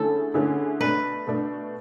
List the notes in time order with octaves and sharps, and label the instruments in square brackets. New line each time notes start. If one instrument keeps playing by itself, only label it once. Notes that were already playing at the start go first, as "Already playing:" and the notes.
Already playing: [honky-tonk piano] D3 A3 C#4 E4 G#4 [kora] A4
[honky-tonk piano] D3 A3 C#4 E4 G#4
[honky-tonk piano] B2 A3 D4 [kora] B4
[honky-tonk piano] B2 A3 D4